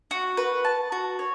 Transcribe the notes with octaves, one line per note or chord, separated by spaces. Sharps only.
F#4
B4
A5
F#4
C#5